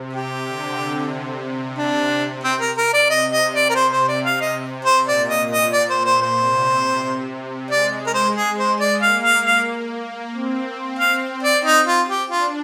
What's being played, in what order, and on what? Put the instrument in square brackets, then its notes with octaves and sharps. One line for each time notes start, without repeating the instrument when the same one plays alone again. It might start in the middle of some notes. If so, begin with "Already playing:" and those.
Already playing: [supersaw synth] C3
[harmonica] G4
[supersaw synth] D3
C3
[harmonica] D4
C4
A#4
A#4
D5
[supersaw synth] C3 [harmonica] D#5
[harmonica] D#5
D5
A#4
[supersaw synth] C3 [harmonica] C5
[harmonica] C5
D5
F5
D#5
C5
[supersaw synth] A#2 [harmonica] D5
[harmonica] D#5
D#5
D5
C5
C5
C5
[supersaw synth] C3
[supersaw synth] G#3 [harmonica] D5
[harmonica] A#4
C5
G#4
C5
D5
[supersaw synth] A#3 [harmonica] F5
[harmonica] F5
F5
[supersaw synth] C4
[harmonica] F5
D5
D#4
F4
G4
[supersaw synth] D4 [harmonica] F4